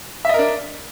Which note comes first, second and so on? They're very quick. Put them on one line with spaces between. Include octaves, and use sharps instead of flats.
E5 D#5 A#4 D4